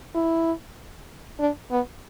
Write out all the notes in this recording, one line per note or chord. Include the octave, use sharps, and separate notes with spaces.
E4
D4
B3